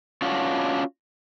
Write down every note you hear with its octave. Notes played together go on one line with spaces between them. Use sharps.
C#4 D4 F4 F#4